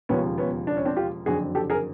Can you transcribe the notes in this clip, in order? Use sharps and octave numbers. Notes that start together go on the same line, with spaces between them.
E1 D#2 C#3 F3 B3 C#4
B3 C#4
D4
C#4
C4 D4
F4 G4
F#1 F2 D3 F#3 F#4 G#4
G4 A4
G#4 A#4